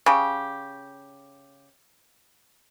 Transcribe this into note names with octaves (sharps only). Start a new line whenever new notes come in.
C#3 G4